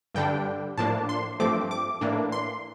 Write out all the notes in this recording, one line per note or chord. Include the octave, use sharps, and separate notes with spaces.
G2 D3 G3 D4 G5
A2 F3 A#3 D4 A5
C6
G2 F3 A3 C4 D6
D6
A2 E3 A#3 D4
C6